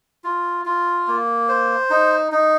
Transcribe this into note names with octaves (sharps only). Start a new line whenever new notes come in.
F4
F4
A#3
C5
D#4
D#4